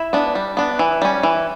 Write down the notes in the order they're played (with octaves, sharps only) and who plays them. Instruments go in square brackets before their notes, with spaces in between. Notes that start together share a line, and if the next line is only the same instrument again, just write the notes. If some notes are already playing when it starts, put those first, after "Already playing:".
Already playing: [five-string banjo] E4 E5
B3 D4
G3
B3 D4
E3
G3 C#4
E3